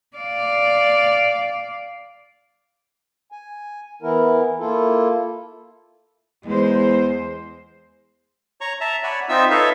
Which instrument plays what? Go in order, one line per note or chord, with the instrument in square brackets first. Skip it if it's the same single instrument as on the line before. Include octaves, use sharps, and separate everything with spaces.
[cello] D5 F5
[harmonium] G#5
E3 B3 E4 A#4
A#3 E4 F4 A4
[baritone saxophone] E2 [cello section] G#3 C5
[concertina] C#5 A#5 C#6
E5 A5 A#5
C#5 D5 F#5 G#5 B5
C4 D#4 F4 E5 E6
D#4 A4 B4 C#5 E5 F5